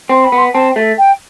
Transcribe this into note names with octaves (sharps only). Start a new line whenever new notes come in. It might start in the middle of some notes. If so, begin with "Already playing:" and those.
C4 C6
B5
B3
C6
C4 A5
A3
G5